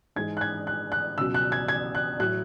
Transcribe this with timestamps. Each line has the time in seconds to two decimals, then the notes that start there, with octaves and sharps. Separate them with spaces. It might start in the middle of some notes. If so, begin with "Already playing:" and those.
0.16 G#2 E3 G#3 G#6
0.37 F#6
0.41 G#6
0.67 F#6
0.92 F#6
1.18 C#2 B2 F#3 E6
1.34 F#6
1.52 G#6
1.68 G#6
1.95 F#6
2.19 A2 F#3 F#6